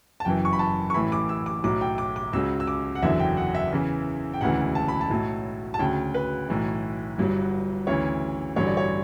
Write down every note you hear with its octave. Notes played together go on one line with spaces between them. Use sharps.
A5
F#1 F#2 E3 G5
C#6
B5
A5
C#6
A1 A2 E3 B5
D6
E6
D6
B1 A2 F#3 D6
G5
D6
D6
C#2 C#3 F#3 E6
E6
D6
F#5
F#1 E2 D3 F#3 E5
G5
F#5
E5
E2 C#3 E3
G5
E1 D2 C#3 E3 F#5
A5
B5
A5
B1 A2 F#3
A5
D2 C#3 F#3 G5
B4
B1 A2 E3
G1 G2 F#3
D2 C#3 E3 C#5
A1 G2 D3 F#3 C#5
D5
C#5